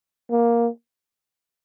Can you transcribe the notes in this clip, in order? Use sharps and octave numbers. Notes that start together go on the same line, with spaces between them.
A#3